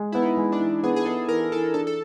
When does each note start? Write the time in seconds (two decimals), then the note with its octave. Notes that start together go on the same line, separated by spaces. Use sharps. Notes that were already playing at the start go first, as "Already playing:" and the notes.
Already playing: G#3
0.12 B3 E4
0.22 D#4
0.37 G#3
0.52 D4
0.60 E3
0.84 B3 G#4
0.96 G#4
1.05 B3 A4
1.28 E3 A#4
1.51 E3 A4
1.74 D4 A4
1.87 A4